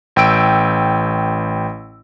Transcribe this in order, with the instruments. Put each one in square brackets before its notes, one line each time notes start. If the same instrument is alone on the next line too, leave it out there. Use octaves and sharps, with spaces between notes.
[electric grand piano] A1 G5 E6 D7